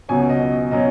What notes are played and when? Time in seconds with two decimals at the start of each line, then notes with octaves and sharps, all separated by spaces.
0.09 C#2 B2 F#3 C#4 G#5
0.29 D#5
0.71 B2 F#3 C#4 D#5